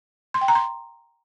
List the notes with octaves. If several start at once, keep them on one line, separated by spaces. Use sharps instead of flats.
C6
G5
A#5
C6